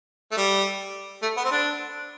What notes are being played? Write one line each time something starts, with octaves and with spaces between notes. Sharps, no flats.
A3
G3
A3
B3
C4
D4